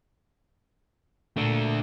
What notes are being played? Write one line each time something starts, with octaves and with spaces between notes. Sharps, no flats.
A#2 A3 A#3 D4